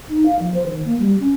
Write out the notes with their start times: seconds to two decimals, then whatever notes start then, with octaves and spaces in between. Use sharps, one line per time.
0.10 D#4
0.26 F5
0.40 F3
0.54 C5
0.66 D#3
0.85 A#3
0.99 G3
1.20 C#4